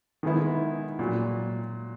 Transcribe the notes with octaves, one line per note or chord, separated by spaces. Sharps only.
D#3 G#3 B3 E4
A#2 F#3